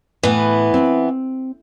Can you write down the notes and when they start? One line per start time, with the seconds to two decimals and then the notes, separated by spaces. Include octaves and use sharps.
0.23 A2 E3 B3
0.74 C4